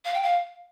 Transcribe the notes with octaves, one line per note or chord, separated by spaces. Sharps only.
F5
G5
F5